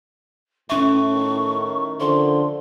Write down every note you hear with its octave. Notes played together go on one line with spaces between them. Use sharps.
A2 C#4 E5 C#6
D#3
D3 F3 C6